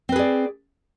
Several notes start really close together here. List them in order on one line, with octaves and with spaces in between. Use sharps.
C4 B4 G#4 D5